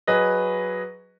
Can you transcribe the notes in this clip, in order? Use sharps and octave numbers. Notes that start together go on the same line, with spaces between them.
F#3 G#4 B4 D#5